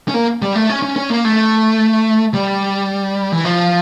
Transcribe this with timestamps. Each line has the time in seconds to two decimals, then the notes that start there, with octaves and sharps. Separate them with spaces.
0.08 C#4
0.14 A#3
0.42 G3
0.55 A3
0.69 C#4
0.82 C#4
0.96 C#4
1.10 A#3
1.25 A3
2.34 G3
3.32 E3
3.45 F3